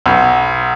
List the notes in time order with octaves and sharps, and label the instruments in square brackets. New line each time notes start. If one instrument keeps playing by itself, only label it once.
[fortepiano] B1